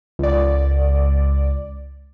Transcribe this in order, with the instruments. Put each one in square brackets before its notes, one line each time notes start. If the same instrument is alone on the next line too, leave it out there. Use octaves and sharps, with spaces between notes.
[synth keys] C#2 D5